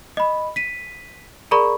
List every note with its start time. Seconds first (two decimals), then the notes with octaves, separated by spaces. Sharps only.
0.17 D#5 B5
0.56 B6 D#7
1.51 G#4 A#4 D5 A#5 B5 C#6